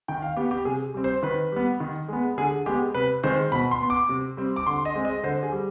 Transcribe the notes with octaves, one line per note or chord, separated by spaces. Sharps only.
D#3 G5
F5
B3 G4
G4
C3 G#4
G3 C4
C5
D#3 B4
G3 B3
D#3
G#3 B3
D3 G#4
G#3 B3 G4
C3 B4
D#3 G#3 C4 C5
B2 B5
C6
B3
D6
C3
G3 C4
D6
D3 C6
D#5
G#3 C4
D#5
D3 C5
G#4
G3